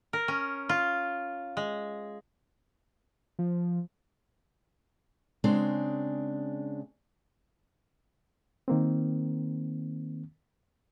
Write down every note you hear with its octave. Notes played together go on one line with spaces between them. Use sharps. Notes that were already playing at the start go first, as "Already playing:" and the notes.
A#4
C#4
F4
G#3
F3
C#3 G#3 C4 D4
D#3 A#3 C4